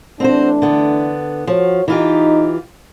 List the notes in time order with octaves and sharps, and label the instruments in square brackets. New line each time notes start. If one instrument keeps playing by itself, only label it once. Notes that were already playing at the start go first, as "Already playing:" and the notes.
[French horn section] E3 A3 D4 [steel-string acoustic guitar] C4 F#4 C5
[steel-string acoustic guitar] D3 B3
[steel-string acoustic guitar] F3 [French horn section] F#4 C#5
[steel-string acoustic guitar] E3 F4 G4 [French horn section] D#4